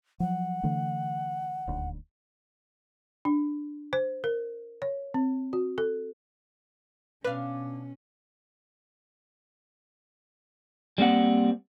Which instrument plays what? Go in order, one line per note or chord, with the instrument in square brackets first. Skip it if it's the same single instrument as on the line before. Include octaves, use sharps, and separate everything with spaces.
[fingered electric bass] F3 F#3 [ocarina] F#5
[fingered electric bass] D3 E3 A3
D#1 D2
[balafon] D4
C5
A#4
C#5
C4
F#4
A4
[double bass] B2 [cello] C#4 [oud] D4 F5 [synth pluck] B4
[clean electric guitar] G3 A#3 C4 F#5